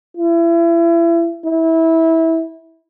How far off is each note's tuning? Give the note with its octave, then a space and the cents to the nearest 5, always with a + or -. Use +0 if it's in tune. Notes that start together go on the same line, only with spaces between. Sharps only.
E4 +35
E4 -20